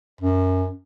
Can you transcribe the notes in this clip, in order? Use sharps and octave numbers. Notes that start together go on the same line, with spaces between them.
F#2